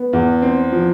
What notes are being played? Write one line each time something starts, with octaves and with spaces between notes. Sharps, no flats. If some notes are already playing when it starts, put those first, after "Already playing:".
Already playing: B3
E2
C4
F3